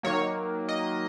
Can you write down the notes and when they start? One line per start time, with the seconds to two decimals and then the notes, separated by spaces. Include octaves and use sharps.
0.03 D#3 F#3 A#3 C#5
0.69 D#5